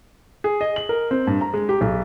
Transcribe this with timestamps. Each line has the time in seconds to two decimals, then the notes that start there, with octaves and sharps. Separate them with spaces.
0.44 G#4
0.61 D#5
0.76 F#7
0.89 A#4
1.11 C4
1.27 G2
1.41 A#5
1.54 G#3
1.69 G4
1.81 B1